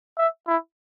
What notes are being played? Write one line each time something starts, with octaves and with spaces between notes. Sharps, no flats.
E5
E4